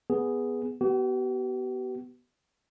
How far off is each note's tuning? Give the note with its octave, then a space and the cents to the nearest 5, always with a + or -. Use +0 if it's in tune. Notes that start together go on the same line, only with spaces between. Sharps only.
B3 +0 G#4 +0
B3 +0 G4 -45